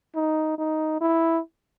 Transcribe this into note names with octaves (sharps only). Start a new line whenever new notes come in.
D#4
D#4
E4